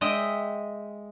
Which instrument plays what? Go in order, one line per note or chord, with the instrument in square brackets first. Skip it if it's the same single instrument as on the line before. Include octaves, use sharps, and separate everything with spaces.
[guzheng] G#3 D#5 E5 G5